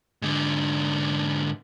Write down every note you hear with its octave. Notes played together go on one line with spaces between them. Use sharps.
G#2 D3